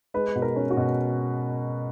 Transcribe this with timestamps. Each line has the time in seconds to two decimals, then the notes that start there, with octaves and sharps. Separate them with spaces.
0.14 G#3 B4
0.35 B2
0.42 A#4
0.56 C#4
0.71 F#4
0.77 B2